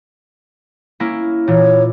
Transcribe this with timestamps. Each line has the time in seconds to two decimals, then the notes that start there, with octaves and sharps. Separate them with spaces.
1.00 A#3 C#4 E4
1.48 A#2 E3 C#5